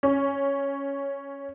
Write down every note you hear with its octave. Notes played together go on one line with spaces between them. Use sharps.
C#4